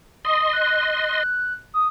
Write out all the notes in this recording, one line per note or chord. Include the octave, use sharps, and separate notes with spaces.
D#5 C6 D#6
F#6
D#6